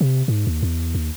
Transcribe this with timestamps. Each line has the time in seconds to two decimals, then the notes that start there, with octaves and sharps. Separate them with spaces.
0.01 C3
0.28 G#2
0.47 D#2
0.63 E2
0.95 D#2